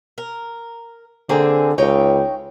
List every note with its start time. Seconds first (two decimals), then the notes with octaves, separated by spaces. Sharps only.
0.18 A#4
1.29 D3 A#3 C4 G#4
1.78 C#2 D#4 C#5 G5